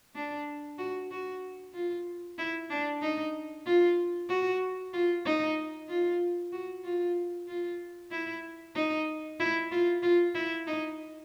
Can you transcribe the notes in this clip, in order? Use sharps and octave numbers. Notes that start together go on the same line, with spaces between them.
D4
F#4
F#4
F4
E4
D4
D#4
F4
F#4
F4
D#4
F4
F#4
F4
F4
E4
D#4
E4
F4
F4
E4
D#4